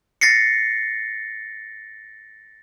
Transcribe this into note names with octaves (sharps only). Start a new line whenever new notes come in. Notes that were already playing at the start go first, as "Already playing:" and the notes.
A6 A#6 C7 C#7